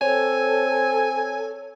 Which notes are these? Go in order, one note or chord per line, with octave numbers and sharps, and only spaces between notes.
C4 A4 C#5 G#5